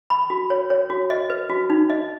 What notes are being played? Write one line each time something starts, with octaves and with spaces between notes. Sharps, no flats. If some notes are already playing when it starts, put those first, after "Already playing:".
B5
F#4
C#5
C#5
F#4
D#5
B4
F#4
D#4
D#5